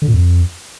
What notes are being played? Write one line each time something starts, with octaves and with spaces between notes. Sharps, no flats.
D3
A#2
F2